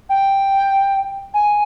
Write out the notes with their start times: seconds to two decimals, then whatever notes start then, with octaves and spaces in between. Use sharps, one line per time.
0.09 G5
1.34 G#5